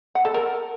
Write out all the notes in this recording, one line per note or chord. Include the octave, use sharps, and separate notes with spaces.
F#5
A4
A#4